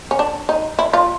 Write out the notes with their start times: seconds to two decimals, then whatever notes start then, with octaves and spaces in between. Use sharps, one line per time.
0.11 C#4
0.19 D4
0.49 D#4
0.79 E4
0.93 F4